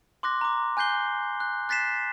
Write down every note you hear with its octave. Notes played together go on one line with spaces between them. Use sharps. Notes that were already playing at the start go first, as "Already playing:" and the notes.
C6 D6 F#6 A#6
A#5 D6
G#5 F#6 G6 C7 G7
F#6
F#6 A6 B6 C7 E7